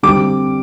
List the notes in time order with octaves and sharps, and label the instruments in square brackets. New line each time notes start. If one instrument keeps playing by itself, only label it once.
[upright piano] D3 G3 C4 [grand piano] D6